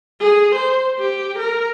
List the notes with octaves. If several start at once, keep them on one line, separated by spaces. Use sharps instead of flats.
G#4
C5
G4
A#4